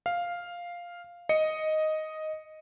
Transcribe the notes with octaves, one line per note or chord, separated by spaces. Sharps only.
F5
D#5 C#7